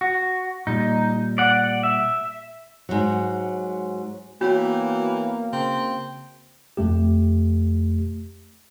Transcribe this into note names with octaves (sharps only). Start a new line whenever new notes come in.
F#4
A#2 G3 D#4
D5 F#5
E5
G#2 F#3
E3 A#3 B3 F#4 C#5 G5
C#3 C4
F2 A3 G4